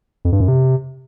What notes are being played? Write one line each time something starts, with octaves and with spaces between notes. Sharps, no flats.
F2
G2
F#2
C3